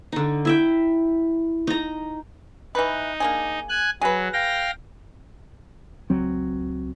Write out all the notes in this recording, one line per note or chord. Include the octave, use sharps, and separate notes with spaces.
D3 D#4
E4 E5 G5
D#4 A#5
E3 D#4 B4
A#3 D4 G#4
G#5 F#6
F#3 G#4 B4
F5 G5 A#6
C#2 F#3 C4